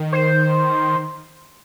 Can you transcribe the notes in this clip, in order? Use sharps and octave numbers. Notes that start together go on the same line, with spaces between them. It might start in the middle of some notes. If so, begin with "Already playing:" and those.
Already playing: D#3
C5